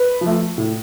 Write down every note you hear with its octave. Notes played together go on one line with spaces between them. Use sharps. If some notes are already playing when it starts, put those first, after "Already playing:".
Already playing: B4
F3
A3
A2